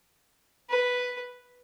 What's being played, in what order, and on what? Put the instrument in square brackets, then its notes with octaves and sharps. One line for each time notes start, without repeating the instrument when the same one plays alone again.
[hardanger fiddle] B4